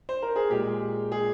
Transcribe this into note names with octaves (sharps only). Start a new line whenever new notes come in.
C5
A#4
G#4
A#2 G#3 G4
G#4